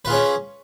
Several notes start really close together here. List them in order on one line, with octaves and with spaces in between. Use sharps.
B4 F4 G#4 C#5 C#4